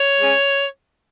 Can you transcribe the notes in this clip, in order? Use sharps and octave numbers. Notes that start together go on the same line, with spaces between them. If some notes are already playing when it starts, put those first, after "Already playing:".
Already playing: C#5
G#3 C#4